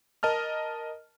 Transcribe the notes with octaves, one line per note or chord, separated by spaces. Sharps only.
A#4 D#5 A5 F6